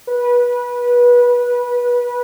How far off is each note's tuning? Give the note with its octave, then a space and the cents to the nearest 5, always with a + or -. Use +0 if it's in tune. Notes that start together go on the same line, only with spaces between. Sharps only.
B4 -20